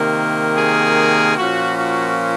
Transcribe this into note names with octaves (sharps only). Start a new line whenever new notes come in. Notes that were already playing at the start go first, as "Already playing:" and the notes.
Already playing: C3 D#3 A#3
G#4
A#2 F3 A#3 C#4 F#4
F#4